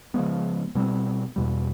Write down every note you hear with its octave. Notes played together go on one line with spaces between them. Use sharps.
C#3 F3 G#3 B3
B2 G3 C4
E2 B2 G3